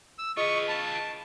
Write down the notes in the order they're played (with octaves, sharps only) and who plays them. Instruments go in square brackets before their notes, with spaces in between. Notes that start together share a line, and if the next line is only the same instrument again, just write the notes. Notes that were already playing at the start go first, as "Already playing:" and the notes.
[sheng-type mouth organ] E6
[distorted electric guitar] F4 B4 [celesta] G#4 D#5 D#6 [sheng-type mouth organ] C#6
[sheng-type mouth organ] A5 [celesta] B5
[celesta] D7